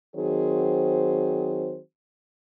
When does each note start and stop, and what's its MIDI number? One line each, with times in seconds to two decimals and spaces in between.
0.15 1.79 51
0.15 1.79 54
0.15 1.79 60
0.15 1.79 66
0.15 1.79 68
0.15 1.79 72